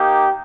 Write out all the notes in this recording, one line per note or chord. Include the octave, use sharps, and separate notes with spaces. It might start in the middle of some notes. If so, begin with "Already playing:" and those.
Already playing: A#3 D#4 G4